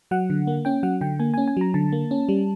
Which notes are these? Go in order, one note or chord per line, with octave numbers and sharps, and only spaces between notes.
F#3 F#5
D3
A#3
C#4 G5
F#3 F#5
D3 G5
A#3 G#5
C#4 G#5
G#5
F#3 A#5
D3 A5
A#3
C#4
G3